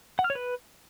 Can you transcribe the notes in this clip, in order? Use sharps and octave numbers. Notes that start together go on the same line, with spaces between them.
F#5
F6
C#5
B4